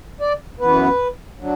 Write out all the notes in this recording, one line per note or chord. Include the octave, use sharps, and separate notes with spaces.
D5
F#2 E3 B3 B4
D3 F#3